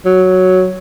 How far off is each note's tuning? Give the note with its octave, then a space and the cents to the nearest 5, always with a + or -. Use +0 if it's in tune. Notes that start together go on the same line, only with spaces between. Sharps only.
F#3 +0